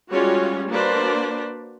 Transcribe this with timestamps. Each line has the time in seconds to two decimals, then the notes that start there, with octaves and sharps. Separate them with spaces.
0.11 G3 G#3 C#4 F4 F#4 C#5
0.70 A#3 D4 F#4 B4 C5 D5